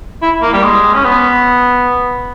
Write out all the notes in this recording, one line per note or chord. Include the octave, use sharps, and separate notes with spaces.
E4
A#3
G3
G#3
C#4
B3